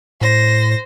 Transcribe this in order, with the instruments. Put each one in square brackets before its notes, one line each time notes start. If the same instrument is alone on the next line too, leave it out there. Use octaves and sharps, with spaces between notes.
[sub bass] A2 [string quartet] C5 A#6